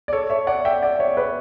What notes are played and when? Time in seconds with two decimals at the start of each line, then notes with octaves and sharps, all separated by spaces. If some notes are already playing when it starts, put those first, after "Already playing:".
0.08 D5
0.13 A4 C#5
0.30 C#5 E5
0.47 D5 F#5
0.65 E5 G5
0.82 D5 F#5
1.00 C#5 E5
1.17 B4 D5